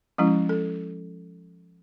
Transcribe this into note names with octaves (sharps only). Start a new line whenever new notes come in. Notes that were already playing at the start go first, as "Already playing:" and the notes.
F3 G#3 C#4 E4
A4